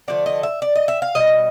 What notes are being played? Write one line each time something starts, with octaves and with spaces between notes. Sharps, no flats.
D3 F3 A3 D5
D#5
E5
D5
D#5
E5
F5
B2 G3 D#5